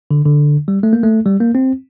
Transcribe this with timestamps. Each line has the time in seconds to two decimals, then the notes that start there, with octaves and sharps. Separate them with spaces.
0.11 D3
0.26 D3
0.68 G3
0.83 A3
0.93 A#3
1.03 A3
1.26 G3
1.40 A#3
1.55 C4